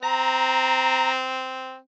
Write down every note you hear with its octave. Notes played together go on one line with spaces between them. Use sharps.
C4 A#5